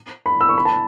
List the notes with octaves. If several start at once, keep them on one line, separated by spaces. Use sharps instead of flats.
B5
E6
C#6
B5
A5